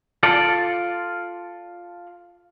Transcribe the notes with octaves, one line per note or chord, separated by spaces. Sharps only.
F4 A4 D5